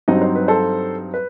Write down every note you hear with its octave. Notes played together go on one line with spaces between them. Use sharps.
G2 F#3 C4 D#4 D#5
C5
B4
A4 C5
B4